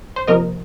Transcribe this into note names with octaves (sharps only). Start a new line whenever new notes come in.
C5
C3 F3 A#3 A#4 D#5